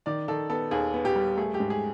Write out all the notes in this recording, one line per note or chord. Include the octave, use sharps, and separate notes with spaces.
D#3 D5
D#3 A4
B3 A4
D#2 G#4
B3
G4
G3
A3 G#4
G4
G#2
G#4